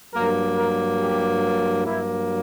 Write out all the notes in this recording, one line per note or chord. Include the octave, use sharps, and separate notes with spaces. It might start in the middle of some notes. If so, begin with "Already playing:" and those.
G2 F#3 A#3 A#4
A#4
G4
G2 F#3 A#3 E4